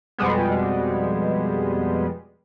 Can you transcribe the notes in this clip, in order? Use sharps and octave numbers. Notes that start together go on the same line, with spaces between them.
F2 B2 G3 G#3 B3